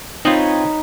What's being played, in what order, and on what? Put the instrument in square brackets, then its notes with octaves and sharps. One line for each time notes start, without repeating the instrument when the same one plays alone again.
[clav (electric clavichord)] C4 F4 [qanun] D#4 B4 C#5